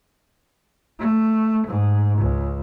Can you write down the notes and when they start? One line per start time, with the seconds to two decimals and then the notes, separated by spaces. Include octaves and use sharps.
0.99 A3
1.67 G#2
2.18 C#2